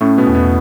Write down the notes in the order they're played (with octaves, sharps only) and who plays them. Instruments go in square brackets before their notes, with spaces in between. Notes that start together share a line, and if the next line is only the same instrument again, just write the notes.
[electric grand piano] A2 A3 [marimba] C#4
[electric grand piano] B2 B3
[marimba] E2
[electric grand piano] B2 B3